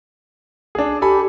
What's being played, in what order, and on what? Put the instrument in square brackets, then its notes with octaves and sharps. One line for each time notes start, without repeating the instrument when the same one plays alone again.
[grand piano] D4 G#4
[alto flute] G4 [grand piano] A4 G#5 B5